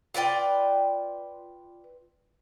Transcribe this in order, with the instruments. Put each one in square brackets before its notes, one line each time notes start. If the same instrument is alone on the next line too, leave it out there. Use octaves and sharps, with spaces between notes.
[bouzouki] F4 B4 D5 G5